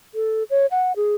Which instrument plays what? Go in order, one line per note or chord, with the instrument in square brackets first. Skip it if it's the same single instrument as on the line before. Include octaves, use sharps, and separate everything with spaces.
[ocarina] A4
C#5
F#5
G#4